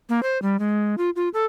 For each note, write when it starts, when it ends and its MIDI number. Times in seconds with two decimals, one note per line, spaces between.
0.09 0.23 58
0.23 0.40 72
0.42 0.59 55
0.59 0.95 56
0.98 1.10 65
1.16 1.29 65
1.34 1.45 69